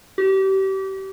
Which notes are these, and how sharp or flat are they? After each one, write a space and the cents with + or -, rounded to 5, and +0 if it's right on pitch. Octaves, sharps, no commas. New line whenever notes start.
G4 -30